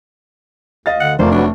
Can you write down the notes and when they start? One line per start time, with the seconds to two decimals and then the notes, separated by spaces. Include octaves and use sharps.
0.86 D2 D#5 F5 A6
1.01 D3 F#5
1.19 F1 A3 F4 A#4 C5 D5
1.31 F#3 D4 F#4 B4